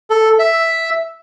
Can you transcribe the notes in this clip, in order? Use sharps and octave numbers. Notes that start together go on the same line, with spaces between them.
A4
E5